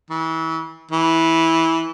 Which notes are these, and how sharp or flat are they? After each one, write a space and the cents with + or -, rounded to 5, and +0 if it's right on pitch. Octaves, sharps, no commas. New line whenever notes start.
E3 -30
E3 -15